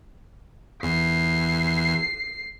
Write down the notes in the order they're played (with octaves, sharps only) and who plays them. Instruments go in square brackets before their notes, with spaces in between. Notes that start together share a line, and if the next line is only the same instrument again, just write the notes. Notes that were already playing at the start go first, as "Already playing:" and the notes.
[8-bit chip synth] E2 [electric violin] C7